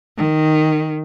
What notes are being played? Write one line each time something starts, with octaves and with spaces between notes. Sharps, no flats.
D#3